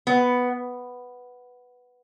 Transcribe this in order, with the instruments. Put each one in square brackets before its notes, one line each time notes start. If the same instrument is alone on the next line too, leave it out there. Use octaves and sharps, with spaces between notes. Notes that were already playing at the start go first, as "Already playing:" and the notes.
[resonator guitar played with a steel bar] B3